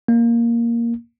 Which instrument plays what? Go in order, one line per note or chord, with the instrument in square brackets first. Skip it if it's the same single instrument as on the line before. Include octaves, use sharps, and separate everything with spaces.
[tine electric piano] A#3